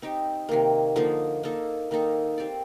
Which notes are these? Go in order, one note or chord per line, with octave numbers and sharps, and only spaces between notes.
C4 D#4 G4
C3 D#3 A#3
D3 F3 A#3 D#4
A#3 D#4 A4
D#3 A#3 D#4 A4
C4 G4 D5